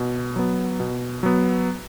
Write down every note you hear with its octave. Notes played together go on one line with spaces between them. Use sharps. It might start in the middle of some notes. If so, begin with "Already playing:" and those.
Already playing: B2
F#3 B3
B2
F#3 B3